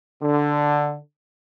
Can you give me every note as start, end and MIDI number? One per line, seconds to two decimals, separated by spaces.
0.21 0.97 50